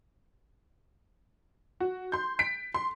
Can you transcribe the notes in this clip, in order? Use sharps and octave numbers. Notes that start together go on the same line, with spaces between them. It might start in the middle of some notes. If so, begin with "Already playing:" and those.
F#4
C6 G6
B6 D7
C6